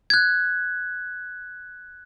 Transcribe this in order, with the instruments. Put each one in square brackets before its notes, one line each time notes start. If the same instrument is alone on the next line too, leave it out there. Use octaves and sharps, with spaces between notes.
[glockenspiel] F#6 G#6